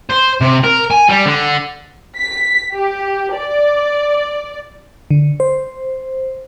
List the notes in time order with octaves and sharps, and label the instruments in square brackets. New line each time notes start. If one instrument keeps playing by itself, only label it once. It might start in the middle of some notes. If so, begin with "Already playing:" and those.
[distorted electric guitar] C5
C3
A#4
G#5
G3
D3
[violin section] B6
G4
D5
[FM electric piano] D3
C5